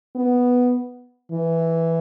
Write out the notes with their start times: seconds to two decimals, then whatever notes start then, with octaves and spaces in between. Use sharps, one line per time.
0.16 B3
1.32 E3